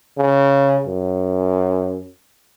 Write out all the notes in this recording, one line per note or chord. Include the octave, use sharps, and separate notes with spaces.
C#3
F#2